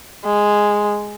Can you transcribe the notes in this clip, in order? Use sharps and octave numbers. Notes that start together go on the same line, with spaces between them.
G#3